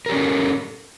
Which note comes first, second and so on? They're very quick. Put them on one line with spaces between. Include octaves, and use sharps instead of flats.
A#4 G4 C#4 A4